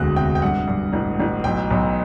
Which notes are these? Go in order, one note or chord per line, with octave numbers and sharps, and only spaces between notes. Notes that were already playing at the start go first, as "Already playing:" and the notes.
Already playing: E1 D2 C3 F#6
C3 G5
G5
G2 F#5
G2
A1
A1
B1 G5
B1